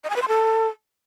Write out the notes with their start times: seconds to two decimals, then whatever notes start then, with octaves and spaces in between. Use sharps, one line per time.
0.04 D#5
0.10 G#5
0.16 B4
0.22 C6
0.28 A4